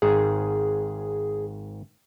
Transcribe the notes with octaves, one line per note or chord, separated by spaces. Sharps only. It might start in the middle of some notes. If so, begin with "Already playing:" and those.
G#1 G#2 G#4